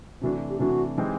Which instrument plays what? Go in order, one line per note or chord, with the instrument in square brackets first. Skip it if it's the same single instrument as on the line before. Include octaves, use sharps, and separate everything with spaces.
[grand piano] C3 E3 A3 D4 [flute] F#4
[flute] G4
[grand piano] C3 E3 A3 D4 [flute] F#4
[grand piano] E3 G#3 C4 D#4 G4